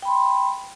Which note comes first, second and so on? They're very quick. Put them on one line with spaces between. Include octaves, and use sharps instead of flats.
G5 B5 C6